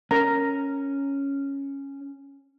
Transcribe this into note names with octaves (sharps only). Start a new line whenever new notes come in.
C#4 A#4 A#5